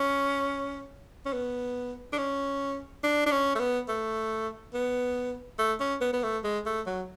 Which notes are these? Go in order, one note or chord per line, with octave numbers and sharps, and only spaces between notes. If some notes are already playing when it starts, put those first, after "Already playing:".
Already playing: C#4
C#4
B3
D4
C#4
D4
D4
C#4
A3
B3
A3
B3
A3
C#4
B3
B3
A3
G#3
A3
F#3